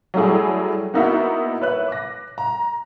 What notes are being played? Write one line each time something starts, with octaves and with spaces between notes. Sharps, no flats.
F#3 G3 A3 E4 G#4
A#3 B3 D#4 E4 F#4 E5
B4 C#5 E5 F#6
D6 A#6
A#5